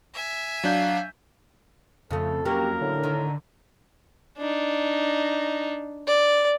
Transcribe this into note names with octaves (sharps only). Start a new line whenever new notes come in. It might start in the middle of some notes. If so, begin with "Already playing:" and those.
E5 G#5
F#3 D4 F5 G6
F2 C#3 A3 A4
F#3 A#3 C#4 G4 A#4
A2 D3
D#3
D4 D#4
D5